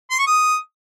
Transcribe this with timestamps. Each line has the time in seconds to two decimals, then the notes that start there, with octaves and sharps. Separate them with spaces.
0.11 C6
0.19 C#6
0.27 D#6